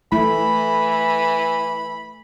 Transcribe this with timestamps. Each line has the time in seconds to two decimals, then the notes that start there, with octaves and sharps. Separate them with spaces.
0.12 E3 A3 E4 B5